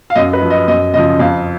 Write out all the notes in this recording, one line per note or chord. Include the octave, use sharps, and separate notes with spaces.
F5
F#2 D#5
B4
F3
D#5
F#2 D#5
C#3 F3 D#5
F2 F5